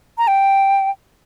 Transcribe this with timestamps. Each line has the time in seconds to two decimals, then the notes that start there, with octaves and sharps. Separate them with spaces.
0.18 A#5
0.28 G5